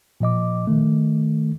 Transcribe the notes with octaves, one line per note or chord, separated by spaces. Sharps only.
A#2 F3 D#5 D6
D#3 A3